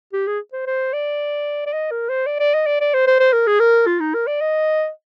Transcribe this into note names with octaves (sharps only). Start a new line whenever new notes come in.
G4
G#4
C5
C5
D5
D5
D#5
A#4
C5
D5
D5
D#5
D5
D5
C5
C5
C5
A#4
G#4
A#4
F4
D#4
A#4
D5
D#5